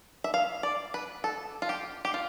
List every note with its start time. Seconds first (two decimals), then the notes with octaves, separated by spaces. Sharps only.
0.24 E5
0.34 F5
0.63 D5
0.94 B4
1.24 A4
1.62 F4
1.69 G4
2.05 G4
2.14 F4